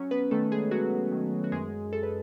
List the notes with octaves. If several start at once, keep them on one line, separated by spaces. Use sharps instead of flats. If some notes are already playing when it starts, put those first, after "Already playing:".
Already playing: F#3 C#4 C#5
B3 B4
D#3 A3 A4
G#3 G#4
F#3 F#4
D#3
F#4
F#2 G#3 G#4
F#2 A4
B4